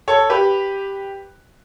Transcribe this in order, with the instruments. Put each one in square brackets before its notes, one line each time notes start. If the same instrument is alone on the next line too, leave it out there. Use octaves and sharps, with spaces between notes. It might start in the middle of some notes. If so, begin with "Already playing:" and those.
[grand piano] A4 C#5
G4 B4